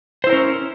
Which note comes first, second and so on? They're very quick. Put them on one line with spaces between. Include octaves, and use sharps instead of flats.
C5 E4 A#4 C#4